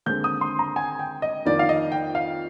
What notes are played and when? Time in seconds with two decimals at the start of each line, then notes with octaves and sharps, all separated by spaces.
0.06 D#2 D3 G#3 C4 G6
0.24 D#6
0.41 C6
0.59 A#5
0.76 G#5
0.99 G5
1.22 D#5
1.45 F2 D#3 A#3 D5
1.59 F5
1.69 D#5
1.92 G5
2.15 F5